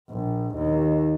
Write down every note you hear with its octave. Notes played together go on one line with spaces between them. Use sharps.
A#1
D#2